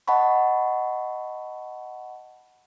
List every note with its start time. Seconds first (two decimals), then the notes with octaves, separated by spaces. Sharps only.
0.07 D#5 F#5 A5 B5 C#6